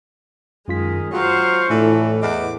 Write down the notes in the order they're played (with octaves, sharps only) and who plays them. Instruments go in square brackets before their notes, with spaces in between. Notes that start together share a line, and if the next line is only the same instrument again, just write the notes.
[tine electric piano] F#2 F4 B6 [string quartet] D#3 G#3
[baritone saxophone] F#3 [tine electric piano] F4 [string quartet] C5 F5 C#6
[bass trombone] A2 [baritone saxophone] E3 [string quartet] D4 A4
[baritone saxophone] E2 [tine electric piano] D#5 [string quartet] D6